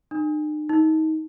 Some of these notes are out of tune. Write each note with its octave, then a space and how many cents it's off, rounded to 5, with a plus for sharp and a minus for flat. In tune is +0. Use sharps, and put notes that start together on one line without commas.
D#4 -45
D#4 +25